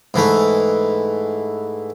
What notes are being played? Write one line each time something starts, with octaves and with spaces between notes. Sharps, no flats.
G#2 E3 A3